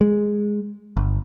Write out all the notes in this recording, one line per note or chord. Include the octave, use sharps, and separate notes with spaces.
G#3
G1